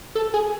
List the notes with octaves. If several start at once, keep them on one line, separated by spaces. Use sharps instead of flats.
A4
G#4